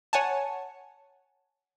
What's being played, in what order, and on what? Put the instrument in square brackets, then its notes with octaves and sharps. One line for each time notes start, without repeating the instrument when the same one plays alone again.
[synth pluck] C#5 F#5 G#5 A5